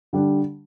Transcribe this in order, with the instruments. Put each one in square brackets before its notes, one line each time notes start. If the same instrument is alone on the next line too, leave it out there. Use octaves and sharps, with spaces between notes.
[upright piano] D3 G3 D4